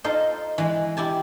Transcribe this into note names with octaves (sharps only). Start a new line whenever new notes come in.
D#4 F4 A4 C5 D#5
E3 G#3
E4 G4 G#5 A5